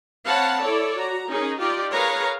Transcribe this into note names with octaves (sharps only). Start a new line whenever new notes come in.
C4 C#5 F5 F#5 A5 B5
E4 A4 C#5 D5
F#4 A#5
C#4 D#4 G#4 A#4
D#4 F4 G4 D5
G#4 A#4 B4 C#5 F5 A#5